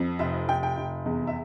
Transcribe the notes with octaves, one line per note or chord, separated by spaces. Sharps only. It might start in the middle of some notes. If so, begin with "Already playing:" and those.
Already playing: F2
F1 E5
F1 G5
G5
F1
E2
E5